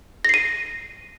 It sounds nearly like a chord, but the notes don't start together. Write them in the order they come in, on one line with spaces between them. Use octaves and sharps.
A#6 C7 D#7